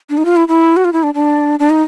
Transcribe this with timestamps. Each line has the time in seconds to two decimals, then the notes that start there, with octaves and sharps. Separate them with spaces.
0.10 D4
0.17 D#4
0.25 F4
0.36 E4
0.48 E4
0.76 F#4
0.85 F4
0.93 E4
1.03 D4
1.14 D4
1.59 D4
1.70 D#4